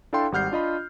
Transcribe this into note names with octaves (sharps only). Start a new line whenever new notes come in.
D4 E4 A4 F5 G5 C6
G#1 G3 F#5 F6 G6 C7
D4 F4 D#5 B5